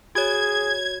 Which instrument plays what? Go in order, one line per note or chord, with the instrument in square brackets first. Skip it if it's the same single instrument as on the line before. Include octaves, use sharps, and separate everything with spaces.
[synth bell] F#4 C#5 [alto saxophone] G#4 [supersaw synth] G#6